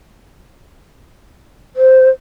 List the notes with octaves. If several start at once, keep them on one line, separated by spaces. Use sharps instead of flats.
C5